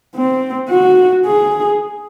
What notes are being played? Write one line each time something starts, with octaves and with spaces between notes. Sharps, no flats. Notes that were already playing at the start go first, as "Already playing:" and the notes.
C4
F#4
G#4